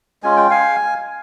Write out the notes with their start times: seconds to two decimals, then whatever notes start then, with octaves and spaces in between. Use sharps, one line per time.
0.23 G#3 C#4 F4 G#5
0.37 G5
0.50 F5 G#5